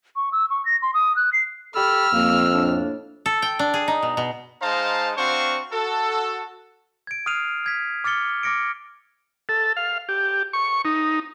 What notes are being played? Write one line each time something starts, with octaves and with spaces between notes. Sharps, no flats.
C#6
E6
C#6
A#6
C6
D#6
F#6
C7
G4 A4 B5 E6 F6
F2 A#3
A2 A#3 D4
A4
G5
D4
G#4
D#4
B2
B2
G#3 D#4 C5 F5 A5 A#5
C4 D4 F#4 C5 F5 C#6
F#4 A4
G#6 D7
D#6 F6 F#6 C7 D#7 F7
F6 G#6 B6
D6 F6 A6 C#7 G7
D6 F6 A#6 C#7 D7
A4
F5
G4
C#6
D#4